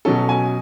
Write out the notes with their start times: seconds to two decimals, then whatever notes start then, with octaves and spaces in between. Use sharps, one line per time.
0.05 B2 F#3 C#4 A4
0.29 G#5